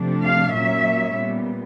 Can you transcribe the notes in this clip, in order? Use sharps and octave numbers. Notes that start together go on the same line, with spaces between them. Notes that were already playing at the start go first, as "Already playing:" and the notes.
Already playing: C3 F3 A3 D4
F5
A#2 F#3 A#3 C#4 E5
A#2 G3 B3